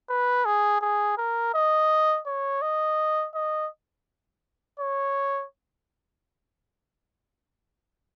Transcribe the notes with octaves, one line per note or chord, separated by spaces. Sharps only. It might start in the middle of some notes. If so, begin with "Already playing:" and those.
B4
G#4
G#4
A#4
D#5
C#5
D#5
D#5
C#5